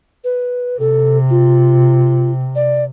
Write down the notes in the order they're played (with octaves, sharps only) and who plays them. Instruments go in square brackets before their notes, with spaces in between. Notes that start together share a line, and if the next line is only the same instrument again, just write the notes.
[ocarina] B4
[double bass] C3 [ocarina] A4
[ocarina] F4
D5